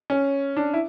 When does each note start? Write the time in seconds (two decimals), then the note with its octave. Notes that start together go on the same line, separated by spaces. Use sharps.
0.10 C#4
0.57 D4
0.74 E4